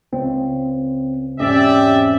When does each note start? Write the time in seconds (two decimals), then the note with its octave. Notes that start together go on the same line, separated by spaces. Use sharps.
0.13 C#2 C4
1.40 E1 G#2 C4 C#4 G4 D5 E5